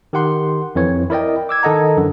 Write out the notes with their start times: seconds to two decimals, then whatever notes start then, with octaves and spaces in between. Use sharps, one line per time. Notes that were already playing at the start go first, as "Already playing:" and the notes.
0.13 D#3 G4 F#5 C6
0.75 F2 E3 C#5
1.10 E4 A#4 D5 D#5 G5
1.49 D6 E6 G#6
1.63 D#3 A4 D#5 F#5 A#5
1.97 F#2 D3 E3